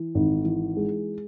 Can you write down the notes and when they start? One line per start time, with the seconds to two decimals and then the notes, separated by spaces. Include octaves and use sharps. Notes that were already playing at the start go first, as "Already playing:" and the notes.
Already playing: E3
0.15 G#1
0.45 E3
0.77 G#3